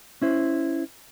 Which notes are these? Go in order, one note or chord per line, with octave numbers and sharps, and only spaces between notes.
C#4 E4 C5